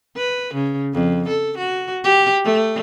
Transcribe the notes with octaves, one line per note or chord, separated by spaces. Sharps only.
B4
C#3
F2
A4
F#4
G4
A3